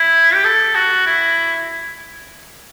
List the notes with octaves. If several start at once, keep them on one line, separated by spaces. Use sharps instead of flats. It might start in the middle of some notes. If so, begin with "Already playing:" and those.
Already playing: E4
G4
A4
F#4
E4